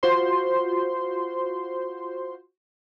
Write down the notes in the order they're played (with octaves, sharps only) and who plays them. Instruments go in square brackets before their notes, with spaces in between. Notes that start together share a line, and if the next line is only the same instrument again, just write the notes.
[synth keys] F4 F#4 C5 C6